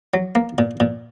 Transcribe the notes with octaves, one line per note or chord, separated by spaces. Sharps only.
F#3
A#3
A#2
A#2